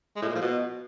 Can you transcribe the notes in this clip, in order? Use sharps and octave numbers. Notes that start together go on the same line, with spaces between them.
G#3
A2
A#2
F3
B2